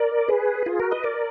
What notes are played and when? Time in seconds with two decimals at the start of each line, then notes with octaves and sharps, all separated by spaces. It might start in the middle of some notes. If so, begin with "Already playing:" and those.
Already playing: A#4 D5
0.28 G#4 B4
0.66 F4 G#4
0.80 F#4 A#4
0.91 B4 D#5
1.04 A#4 D5